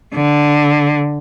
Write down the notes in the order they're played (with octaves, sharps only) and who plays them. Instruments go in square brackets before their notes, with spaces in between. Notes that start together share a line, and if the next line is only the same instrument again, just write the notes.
[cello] D3